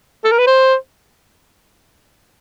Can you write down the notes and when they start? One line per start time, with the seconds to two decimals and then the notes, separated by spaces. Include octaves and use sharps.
0.24 A4
0.32 A#4
0.39 B4
0.47 C5